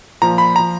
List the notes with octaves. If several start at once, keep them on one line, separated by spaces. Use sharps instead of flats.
A#2 F3 A#5
B5
F3 A#5